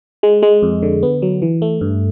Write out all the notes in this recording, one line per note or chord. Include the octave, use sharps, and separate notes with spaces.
G#3
G#3
F2
D3
B3
F#3
E3
A3
G2